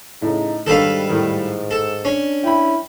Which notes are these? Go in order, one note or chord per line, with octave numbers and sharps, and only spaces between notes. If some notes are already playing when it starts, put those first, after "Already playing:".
A2 C#3 D#4
G#2 D#3 G3 D4 A4 B4 F5
A2 D#3
A4
C#4 D4
E4 G5 B5